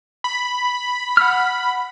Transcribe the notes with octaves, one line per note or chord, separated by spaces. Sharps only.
B5
F#5 F6